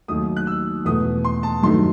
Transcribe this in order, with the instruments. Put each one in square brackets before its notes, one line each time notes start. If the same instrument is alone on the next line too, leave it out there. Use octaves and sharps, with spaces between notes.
[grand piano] D#2 D#3 F#3 A3 D#6
F#6
E6
E2 B2 A3 D#6
C6
A5
G2 D#3 F#3 A3 C6